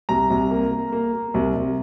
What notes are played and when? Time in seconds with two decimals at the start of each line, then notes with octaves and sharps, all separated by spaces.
0.09 C2 A#5
0.30 C2
0.51 A#3
0.71 A#3
0.92 A#3
1.13 A#3
1.34 C2
1.55 C2